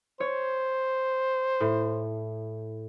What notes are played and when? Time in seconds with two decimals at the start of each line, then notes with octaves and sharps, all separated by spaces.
0.20 C5 C#5
1.60 A2